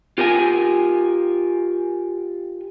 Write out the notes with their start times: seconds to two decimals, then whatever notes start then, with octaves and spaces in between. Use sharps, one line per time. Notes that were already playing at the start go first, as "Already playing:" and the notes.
0.18 F4 G4 A#4 D#5 G#5